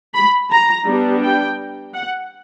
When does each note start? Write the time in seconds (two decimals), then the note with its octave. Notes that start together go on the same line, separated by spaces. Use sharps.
0.14 B5
0.51 A#5
0.86 G3 B3 D4
1.23 G5
1.94 F#5